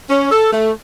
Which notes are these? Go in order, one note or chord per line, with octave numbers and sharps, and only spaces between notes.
C#4
A4
A3